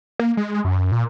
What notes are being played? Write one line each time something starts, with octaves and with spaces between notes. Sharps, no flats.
A#3
G#3
F#2
A#2